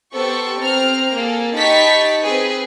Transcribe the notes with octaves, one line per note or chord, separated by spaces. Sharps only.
B3 G4 A4 C5 C#6
C4 A#5 F6
A#3 G#4 A4
D#4 G4 A5 B5 C#6 B6
C4 G#4 B4